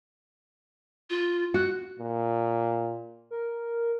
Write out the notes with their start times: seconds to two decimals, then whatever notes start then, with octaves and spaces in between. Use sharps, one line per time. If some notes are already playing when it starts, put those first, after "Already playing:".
1.10 F4
1.54 F#4 F#6
1.99 A#2
3.31 A#4